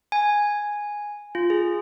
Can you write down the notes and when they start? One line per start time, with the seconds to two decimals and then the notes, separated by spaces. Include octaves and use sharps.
0.12 G#5
1.35 F4
1.50 G#4